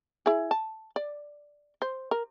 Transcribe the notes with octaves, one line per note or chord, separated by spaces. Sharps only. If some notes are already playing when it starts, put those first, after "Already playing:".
E4 G#4
A5
D5
C5
A#4